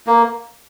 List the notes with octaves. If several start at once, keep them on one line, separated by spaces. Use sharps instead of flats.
A#3